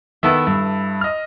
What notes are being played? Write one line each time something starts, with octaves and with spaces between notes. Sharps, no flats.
D#3 B3 E4 A4 E5
G2
D#5 F6